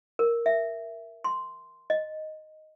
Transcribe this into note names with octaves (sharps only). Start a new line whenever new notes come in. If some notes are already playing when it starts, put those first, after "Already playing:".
A#4
E5
C6
D#5